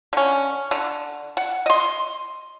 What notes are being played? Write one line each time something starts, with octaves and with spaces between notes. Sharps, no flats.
D3 C#4
D3
F#5
D#5 C6